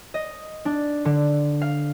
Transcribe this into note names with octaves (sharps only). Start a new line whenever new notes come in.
D#5
D4
D3
F5